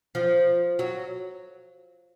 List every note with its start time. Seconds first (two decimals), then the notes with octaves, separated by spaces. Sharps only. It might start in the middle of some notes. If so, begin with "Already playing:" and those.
0.15 F3
0.79 F#3